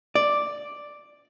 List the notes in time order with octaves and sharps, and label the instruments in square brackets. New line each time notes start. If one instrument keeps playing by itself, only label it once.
[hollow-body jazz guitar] D5